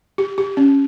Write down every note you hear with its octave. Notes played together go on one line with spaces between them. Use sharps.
G4
G4
C#4